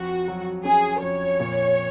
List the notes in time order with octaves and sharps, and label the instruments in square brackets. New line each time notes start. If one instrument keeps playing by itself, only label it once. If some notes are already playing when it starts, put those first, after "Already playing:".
Already playing: [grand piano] F2 [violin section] F#4
[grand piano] F#3
[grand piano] C#4 [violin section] G#4
[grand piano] F2 [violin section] C#5
[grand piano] A#2